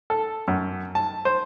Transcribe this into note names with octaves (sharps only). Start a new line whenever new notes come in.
A4
F#2
A5
C5